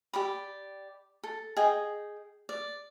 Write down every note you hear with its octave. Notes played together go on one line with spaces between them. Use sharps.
G4 D5 B5
A4
G#4 D#5 G5
D5